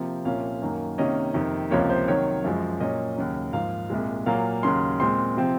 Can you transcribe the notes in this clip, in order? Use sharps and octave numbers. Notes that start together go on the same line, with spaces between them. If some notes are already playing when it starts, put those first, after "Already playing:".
Already playing: C3 F3 A#3
C2 A#2 F3 A#3 C#4 F5
F#2 D#3 F#3 A#3
C3 D#3 A#3 C#4 D#5
F2 C3 D#3
C#2 C3 F3 A#3 C#5
C5
C3 D#3 F#3 C#5
F#2 F3 G#3
A#2 F#3 C#4 D#5
D#2 C#3 F#3
G#2 F3 A#3 D#4 F5
C2 A#2 G#3
A#2 F#3 A#3 F5
D#2 C#3 F#3 C6
A#2 G#3 C4 C6
C3 F3 C4